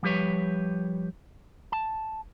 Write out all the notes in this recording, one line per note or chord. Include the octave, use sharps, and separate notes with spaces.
F3 G3 G4 B4 C#5
A5